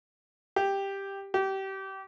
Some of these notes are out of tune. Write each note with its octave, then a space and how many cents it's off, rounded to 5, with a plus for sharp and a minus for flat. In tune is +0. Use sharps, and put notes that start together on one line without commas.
G4 +5
G4 -25